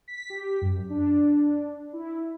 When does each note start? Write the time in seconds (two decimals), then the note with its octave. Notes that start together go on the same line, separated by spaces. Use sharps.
0.08 B6
0.30 G4
0.62 F#2
0.90 D4
1.93 E4